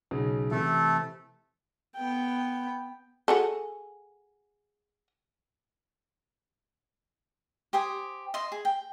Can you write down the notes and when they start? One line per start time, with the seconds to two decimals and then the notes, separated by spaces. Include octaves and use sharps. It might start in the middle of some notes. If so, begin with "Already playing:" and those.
0.11 B1 C#3
0.51 C3 E3 A3 A4
1.96 B3 G5
3.28 F#4 G#4 A4
7.73 G4 C5 G#5 D#6
8.34 D#5 E5 C6
8.52 G#4
8.65 G5